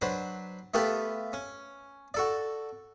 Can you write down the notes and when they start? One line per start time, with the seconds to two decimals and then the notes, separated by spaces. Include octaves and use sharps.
0.02 F#3 D4 B4 C5
0.74 A3 B3 F4 G4 A4 B4
1.33 C#4
2.14 F#4 A4 D5